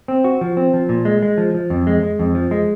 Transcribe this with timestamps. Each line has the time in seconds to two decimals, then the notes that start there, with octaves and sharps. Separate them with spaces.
0.08 C4
0.24 F#4
0.41 F3
0.57 C4
0.74 F3
0.89 A#2
1.05 G#3
1.22 G#3
1.38 F3
1.54 F3
1.70 F2
1.87 G#3
2.03 G#3
2.19 F2
2.35 F3
2.51 G#3